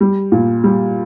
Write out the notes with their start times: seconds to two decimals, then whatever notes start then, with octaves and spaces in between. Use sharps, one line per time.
0.01 G3
0.32 A#2
0.64 G3